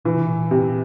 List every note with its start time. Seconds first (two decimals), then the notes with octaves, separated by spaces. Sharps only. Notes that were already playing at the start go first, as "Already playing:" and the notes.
0.05 A#2 E3
0.16 C3
0.27 A#2
0.51 C3